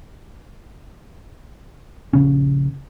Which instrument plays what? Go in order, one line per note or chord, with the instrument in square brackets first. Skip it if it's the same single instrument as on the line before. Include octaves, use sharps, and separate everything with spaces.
[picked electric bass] A#1 C#3 C#4